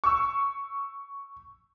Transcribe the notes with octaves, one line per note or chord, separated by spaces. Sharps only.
C#6 E6